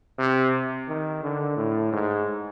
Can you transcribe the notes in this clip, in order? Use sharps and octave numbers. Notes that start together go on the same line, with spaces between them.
C3
D#3
D3
A2
G#2